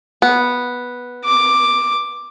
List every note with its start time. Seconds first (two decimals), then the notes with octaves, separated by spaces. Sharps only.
0.22 B3
1.25 D6